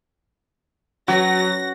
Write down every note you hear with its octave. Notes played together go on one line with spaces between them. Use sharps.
F#3 C#4 F#4 B4 C#5 A#6